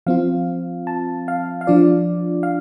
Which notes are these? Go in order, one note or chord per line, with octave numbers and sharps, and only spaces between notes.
F3 C4 F4 F5
A5
F5
F5
F3 D4 F4 D5
F5